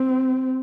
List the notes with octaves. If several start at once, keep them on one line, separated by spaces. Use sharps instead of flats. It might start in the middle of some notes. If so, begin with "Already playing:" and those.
Already playing: C4